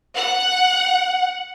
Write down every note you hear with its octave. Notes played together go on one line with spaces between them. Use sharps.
F#5